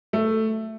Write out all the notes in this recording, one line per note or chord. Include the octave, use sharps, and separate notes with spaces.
A3